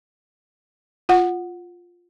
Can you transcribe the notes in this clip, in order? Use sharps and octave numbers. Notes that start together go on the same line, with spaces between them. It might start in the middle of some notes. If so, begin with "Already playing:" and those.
F4 F#5